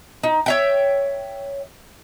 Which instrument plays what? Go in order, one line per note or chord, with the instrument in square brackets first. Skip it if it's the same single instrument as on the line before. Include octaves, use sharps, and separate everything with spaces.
[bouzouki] D#4
C#5 E5 G5